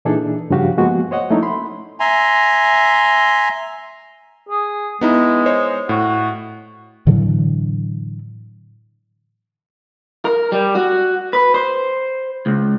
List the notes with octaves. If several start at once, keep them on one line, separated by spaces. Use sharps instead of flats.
A#2 E3 D4 D#4 G#4 A4
G2 C#3 F3 F#4 G4 F5
F3 G#3 A#3 B3 F#4
C5 C#5 D#5 F#5
F3 A3 A#3 C#4 D#4 E4
B5 C6
E5 G#5 A#5 C6
G#4
G#3 B3 D#4 E4
C5 C#5 D#5
A2 F#4
A2 D3 E3 F#3
A#4
G3
F#4
B4
C5
C#2